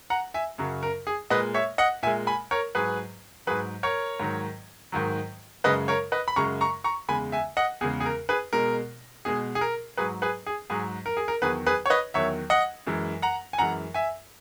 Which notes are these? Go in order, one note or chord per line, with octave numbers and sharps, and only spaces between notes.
F#5 A#5
E5 G#5
F#2 C#3 F#3
A#4
G#4
A#2 G#3 B4 D#5
C#5 E5
D#5 F#5
A#2 G#3 E5 G#5
G#5 B5
A#4 C#5
G#2 F#3 G#4 B4
G#2 F#3 G#4 B4
A#4 C#5
G#2 D#3 F#3
G#2 D#3 F#3
F#2 C#3 G#3 B4 D#5
A#4 C#5
B4 D#5
B5
F#2 C#3 G#3 A#5 C#6
A#5 C#6
A#5 C#6
E2 C#3 G#3 G#5 B5
E5 G#5
D#5 F#5
E2 C#3 G#3 G#4
G#4
A#4
G#4 B4
B2 G#3 A#4
B2 G#3 G#4
G#4
A#4
G#2 F#3 G#4 B4
G#4 B4
G#4
G#2 F#3 G#4
A#4
G#4
A#4
E2 D#3 F#3 G#4 B4
G#4 B4
C#5
B4 D#5
E2 D#3 F#3 C#5 E5
D#5 F#5
F#2 E3 G#3
F#5 A#5
G#5
F#2 E3 G#3 F#5 A#5
E5 G#5